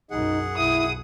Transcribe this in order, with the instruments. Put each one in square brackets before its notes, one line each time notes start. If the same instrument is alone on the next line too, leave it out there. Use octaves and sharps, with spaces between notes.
[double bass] B1 F#2 [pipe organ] D#4 [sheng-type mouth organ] G#4 F#5
[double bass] B1 [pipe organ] E4 [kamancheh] D#6